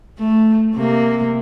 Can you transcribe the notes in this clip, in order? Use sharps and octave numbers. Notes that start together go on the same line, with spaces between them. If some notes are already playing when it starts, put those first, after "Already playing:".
A3
C3 A#3